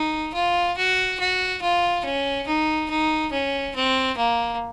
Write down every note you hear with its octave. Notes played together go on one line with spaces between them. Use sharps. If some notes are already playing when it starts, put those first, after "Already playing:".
Already playing: D#4
F4
F#4
F#4
F4
C#4
D#4
D#4
C#4
C4
A#3